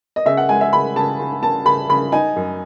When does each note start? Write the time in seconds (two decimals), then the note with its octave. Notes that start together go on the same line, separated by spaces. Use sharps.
0.16 D#5
0.26 C#3 E5
0.37 F#5
0.49 G#3 G#5
0.61 E5
0.73 C#3 B5
0.96 C#3 A5
1.20 C#3
1.43 C#4 A5
1.65 C#3 B5
1.89 C#3 B5
2.12 D#4 G#5
2.36 F#2